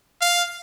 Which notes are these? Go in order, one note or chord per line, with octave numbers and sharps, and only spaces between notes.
F5